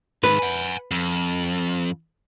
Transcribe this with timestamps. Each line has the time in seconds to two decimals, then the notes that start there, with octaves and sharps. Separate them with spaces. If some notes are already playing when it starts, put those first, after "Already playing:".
0.24 G#2 D#3 B4
0.39 F#5 G#5
0.91 F2